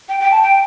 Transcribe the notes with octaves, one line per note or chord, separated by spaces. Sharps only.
G5
G5
A5
G5